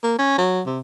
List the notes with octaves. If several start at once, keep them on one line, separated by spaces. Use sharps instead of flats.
A#3
C#4
F#3
C3